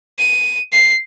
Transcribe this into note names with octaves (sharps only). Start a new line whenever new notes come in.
D#7
C7